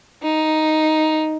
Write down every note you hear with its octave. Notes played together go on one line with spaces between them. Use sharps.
D#4